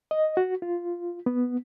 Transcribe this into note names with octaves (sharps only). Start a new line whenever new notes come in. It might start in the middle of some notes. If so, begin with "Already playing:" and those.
D#5
F#4
F4
B3